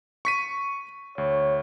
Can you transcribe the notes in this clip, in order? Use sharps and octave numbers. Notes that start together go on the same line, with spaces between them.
C#6 B6 D#7
D2 C#5